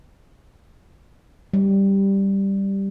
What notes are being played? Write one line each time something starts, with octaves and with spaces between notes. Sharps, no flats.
G3